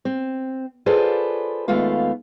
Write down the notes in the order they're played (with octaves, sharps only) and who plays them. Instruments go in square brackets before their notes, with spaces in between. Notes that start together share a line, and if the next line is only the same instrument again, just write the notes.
[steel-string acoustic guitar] C4
F4 G#4 A4 B4 C5 D5
D#2 G#3 A3 B3 F4 F5